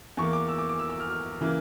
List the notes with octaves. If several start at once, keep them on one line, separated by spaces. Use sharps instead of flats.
E2 E3 A#3 C#6
D6
E6
D6
D6
E6
E6
F6
F6
C#3 E3 A#3